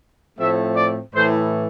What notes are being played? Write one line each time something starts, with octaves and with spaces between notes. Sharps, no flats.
A2 F3 A3 C4 E5
D5
A2 E3 A3 C5